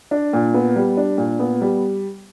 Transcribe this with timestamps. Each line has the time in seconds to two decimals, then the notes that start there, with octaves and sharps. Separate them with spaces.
0.11 D4
0.33 A#2
0.54 B3
0.76 G3
0.97 D4
1.18 A#2
1.39 B3
1.61 G3